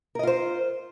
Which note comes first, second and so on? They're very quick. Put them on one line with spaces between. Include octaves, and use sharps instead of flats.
A#4 D#5 F4 C5